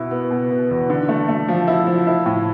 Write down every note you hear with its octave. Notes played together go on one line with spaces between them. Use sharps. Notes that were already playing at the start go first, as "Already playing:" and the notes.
Already playing: B2 E4
B3
B2
B3
E2
D3
A3
A3
F3
E4
F3
E4
A2